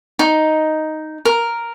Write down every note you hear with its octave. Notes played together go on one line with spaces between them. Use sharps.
D#4
A#4